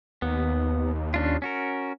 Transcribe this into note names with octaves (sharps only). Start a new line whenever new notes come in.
D#2 B3
C#4 D4 F4
C#4 F#4 A#4